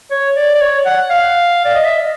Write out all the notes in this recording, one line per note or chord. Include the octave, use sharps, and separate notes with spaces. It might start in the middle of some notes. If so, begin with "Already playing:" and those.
C#5
D5
D5
C#5
F#5
F5
D5
D#5
E5